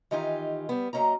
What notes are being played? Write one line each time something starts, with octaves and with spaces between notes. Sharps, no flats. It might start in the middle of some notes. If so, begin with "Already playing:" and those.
D#3 E3 D#4 F4 G4 G#5
G3 B3
F#2 A#3 C#4 D#5 A#5